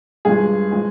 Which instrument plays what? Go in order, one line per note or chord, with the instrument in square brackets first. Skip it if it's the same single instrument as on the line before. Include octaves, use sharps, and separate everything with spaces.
[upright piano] G2 F3 G#3 G#4
F3 G#3